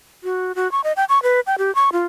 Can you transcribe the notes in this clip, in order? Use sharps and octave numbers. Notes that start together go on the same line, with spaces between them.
F#4
F#4
C#6
D#5
G5
C#6
B4
G5
G4
C#6
F4